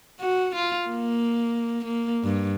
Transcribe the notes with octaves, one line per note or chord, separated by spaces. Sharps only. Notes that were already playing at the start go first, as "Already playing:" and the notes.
F#4
F4
A#3
A#3
G2